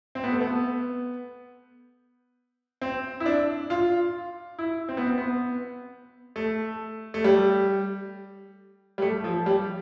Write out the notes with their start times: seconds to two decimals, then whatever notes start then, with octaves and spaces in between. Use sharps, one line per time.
0.15 C4
0.24 B3
0.32 A3
0.41 B3
2.81 C4
3.20 E4
3.26 D4
3.70 F4
4.59 E4
4.89 C4
4.97 B3
5.06 C4
5.18 B3
6.36 A3
7.14 A3
7.24 G3
8.98 G3
9.02 A3
9.24 F3
9.46 G3